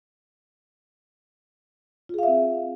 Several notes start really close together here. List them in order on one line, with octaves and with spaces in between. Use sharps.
F4 G#4 F5 E5 C4